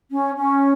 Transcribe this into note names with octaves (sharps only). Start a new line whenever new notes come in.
C#4
C#4